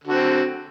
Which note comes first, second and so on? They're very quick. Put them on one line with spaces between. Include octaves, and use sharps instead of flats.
D3 F#4 C4